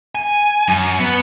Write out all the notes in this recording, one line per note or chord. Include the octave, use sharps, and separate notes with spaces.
G#5
F#2
B3